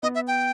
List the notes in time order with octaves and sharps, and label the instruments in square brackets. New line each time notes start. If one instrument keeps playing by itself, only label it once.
[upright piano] B3 [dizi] D#5
[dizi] E5
G5